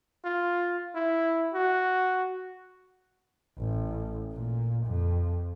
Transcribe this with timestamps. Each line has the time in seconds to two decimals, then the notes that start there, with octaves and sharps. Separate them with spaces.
0.25 F4
0.95 E4
1.54 F#4
3.59 A1
4.33 A#2
4.87 F2